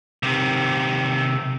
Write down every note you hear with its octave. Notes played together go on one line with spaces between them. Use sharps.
C3 D#3